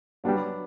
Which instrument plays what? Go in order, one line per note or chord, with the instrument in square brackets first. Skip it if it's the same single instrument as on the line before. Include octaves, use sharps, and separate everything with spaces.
[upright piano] F#3 B3 D4 [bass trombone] G3